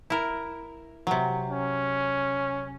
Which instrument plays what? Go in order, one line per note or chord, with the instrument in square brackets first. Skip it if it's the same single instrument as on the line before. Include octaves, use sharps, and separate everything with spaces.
[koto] E4 A#4
C3 F#3
[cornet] C#4